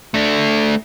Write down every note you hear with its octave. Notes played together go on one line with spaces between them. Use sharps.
A3 D4